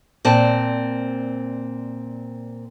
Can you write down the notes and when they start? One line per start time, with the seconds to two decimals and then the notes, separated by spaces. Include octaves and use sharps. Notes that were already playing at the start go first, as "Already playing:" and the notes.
0.25 A#2 C4 D5 A5